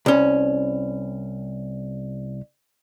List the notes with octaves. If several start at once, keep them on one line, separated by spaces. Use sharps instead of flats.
C2 C#4